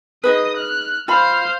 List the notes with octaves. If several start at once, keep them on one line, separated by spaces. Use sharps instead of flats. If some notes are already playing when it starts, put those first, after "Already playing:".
D#4 G#4 B4 D#5 D#6
F6 F#6
F4 C5 F5 B5